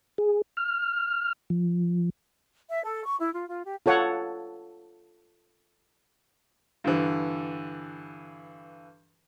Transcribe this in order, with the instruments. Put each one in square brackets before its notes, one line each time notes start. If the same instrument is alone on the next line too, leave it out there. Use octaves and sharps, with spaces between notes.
[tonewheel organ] G#4
F6
F3
[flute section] E5
A4
C#6
E4
F4
F4
G4
[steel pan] F4 A4 C#5 F#5
[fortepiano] G2 D3 E3